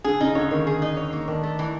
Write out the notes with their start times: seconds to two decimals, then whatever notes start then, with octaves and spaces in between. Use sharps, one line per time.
0.04 D3 G#4
0.20 C#3 D#4
0.35 D3 C#5
0.51 D#3 A#3
0.67 G#4
0.82 D#4
0.97 C#5
1.13 A#3
1.28 D#3 D4
1.43 A3
1.59 E3